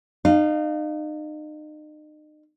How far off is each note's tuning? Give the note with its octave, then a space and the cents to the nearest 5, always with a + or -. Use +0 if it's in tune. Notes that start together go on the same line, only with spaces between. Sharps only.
D#4 -35 F5 +0